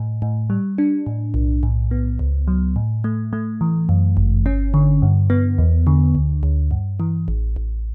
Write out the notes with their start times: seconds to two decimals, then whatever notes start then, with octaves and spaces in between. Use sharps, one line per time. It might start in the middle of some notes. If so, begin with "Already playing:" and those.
Already playing: A2
0.22 A2
0.50 G3
0.78 D4
1.06 A2
1.34 B1
1.63 A2
1.91 B3
2.19 C#2
2.48 F#3
2.76 A2
3.04 A3
3.33 A3
3.61 E3
3.89 F#2
4.17 G1
4.46 C#4
4.74 D3
5.02 G2
5.30 B3
5.58 E2
5.87 D3
6.15 D2
6.43 D2
6.71 G2
7.00 E3
7.28 A1
7.56 A1